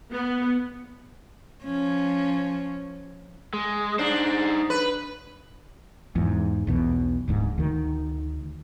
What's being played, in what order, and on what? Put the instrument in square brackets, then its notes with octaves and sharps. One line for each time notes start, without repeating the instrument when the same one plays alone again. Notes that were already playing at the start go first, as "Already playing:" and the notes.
[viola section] B3
[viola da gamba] F3 C#4
[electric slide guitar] G#3
[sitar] D4 [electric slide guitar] D#4 C5
[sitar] B4
[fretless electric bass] E2 G#2
B1 E2 B2
D1 D2 G#2
D2 D#3